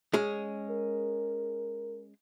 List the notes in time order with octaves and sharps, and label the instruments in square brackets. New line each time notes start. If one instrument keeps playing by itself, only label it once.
[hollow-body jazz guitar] G#3 C#4 G#4
[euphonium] A#4